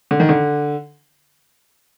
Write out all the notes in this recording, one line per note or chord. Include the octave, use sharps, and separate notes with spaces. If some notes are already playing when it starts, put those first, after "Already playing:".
D3
D#3
D3